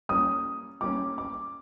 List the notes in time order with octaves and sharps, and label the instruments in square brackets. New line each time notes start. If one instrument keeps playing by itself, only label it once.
[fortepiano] G3 A#3 C#4 [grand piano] D#6
[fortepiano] G3 A#3 C#4 [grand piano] D6
[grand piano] D6